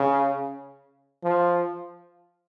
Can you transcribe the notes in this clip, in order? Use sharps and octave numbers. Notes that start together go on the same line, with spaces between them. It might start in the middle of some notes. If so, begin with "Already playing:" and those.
Already playing: C#3
F3